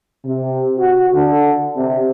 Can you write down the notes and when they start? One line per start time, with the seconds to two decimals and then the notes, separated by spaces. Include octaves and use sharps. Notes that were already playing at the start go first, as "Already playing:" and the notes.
0.25 C3
0.77 F#4
1.13 D3
1.75 C3